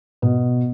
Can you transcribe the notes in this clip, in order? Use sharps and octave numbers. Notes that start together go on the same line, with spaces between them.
B2